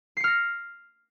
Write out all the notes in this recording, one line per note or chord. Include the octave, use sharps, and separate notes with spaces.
F6 A#6 C7 C#7